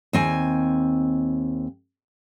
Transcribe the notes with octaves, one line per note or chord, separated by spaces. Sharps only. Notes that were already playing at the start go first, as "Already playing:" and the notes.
D#2 C4 G#5